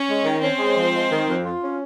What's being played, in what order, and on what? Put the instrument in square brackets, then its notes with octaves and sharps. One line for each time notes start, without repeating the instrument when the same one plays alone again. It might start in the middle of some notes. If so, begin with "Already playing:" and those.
Already playing: [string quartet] C#4 C#5
[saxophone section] G#3
D#3
[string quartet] C4 C5 [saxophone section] C#4
[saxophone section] G#3
F3
G#3
D#3
F2
F4
C#4